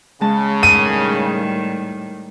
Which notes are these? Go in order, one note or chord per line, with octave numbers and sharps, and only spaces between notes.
C#3 G#3 A5
A2 D#3 G3 D#7